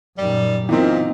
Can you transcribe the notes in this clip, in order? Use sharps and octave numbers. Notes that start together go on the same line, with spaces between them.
F#2 A#2 D#3 G3
A#2 E3 B3 C4 D#4